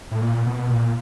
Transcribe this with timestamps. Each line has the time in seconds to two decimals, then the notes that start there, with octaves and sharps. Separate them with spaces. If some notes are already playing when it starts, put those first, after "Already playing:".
0.11 A2
0.21 A#2
0.46 B2
0.70 A#2